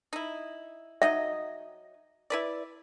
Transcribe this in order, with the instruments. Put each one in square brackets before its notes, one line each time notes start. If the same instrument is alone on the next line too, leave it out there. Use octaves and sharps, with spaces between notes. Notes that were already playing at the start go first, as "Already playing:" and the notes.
[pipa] D#4 E4
[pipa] F#3 D#4 D#5 [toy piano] E5
[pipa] E4 B4 D5